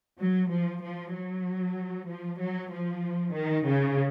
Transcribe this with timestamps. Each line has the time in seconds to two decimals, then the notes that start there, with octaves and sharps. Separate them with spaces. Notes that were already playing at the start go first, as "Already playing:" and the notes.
0.19 F#3
0.51 F3
0.82 F3
1.13 F#3
2.08 F3
2.39 F#3
2.71 F3
3.34 D#3
3.65 C#3